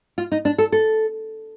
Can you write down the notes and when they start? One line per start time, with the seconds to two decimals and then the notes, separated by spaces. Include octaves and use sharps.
0.18 F4
0.32 D#4
0.45 D4
0.58 A4
0.72 A4